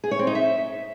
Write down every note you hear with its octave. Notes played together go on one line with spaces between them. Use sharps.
G#4
C#5
C4
D#4
E5